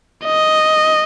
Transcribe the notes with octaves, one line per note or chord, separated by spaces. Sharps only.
D#5